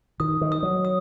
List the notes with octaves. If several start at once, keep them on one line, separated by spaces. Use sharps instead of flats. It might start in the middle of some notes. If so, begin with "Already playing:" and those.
D#3 D#6
D#3
D#6
F#3
D#6